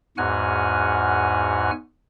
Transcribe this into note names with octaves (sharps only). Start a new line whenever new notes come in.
E2 G#2 F#4 F#5 G#5 F6